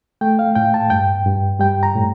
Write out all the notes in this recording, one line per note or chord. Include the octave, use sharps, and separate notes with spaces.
A3 G5
F5
A2 G5
A5
G2 G5
G2
G3 G5
A#5
A2